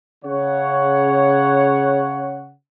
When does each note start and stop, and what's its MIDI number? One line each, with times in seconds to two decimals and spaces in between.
0.25 2.52 49
0.25 2.52 73
0.25 2.52 78